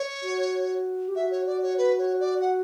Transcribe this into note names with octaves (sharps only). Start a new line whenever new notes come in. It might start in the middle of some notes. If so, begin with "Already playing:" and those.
Already playing: C#5
F#4
G4
F#4 E5
C#5
D5
C#5
B4
C#5
D5
F#5